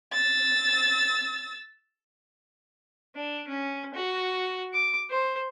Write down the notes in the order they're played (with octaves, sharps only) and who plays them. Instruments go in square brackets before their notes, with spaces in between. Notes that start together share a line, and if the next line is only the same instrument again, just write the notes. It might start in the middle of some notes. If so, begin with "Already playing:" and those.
[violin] E6 A6
[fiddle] D4
C#4
F#4
D6
C5